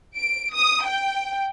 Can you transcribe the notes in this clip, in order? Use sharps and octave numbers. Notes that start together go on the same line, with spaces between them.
D7
D#6
G5